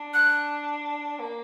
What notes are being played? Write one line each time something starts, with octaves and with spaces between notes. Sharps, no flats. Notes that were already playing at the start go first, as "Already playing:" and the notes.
Already playing: D4
F#6
A#3